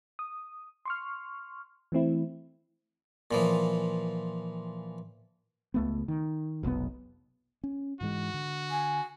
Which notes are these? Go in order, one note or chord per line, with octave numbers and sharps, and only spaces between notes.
D#6
C6 C#6 F6
E3 A3 C4 E4
A#2 E3 F3
C#2 A3 B3
D#3
F1 B1 G#2 B3
C#4
G#2 E3 G#3 F#4
D3
G#5